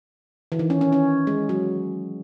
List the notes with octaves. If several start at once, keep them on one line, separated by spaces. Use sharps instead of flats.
E3
D#3
C#4
C#4
C#4
G#3
F#3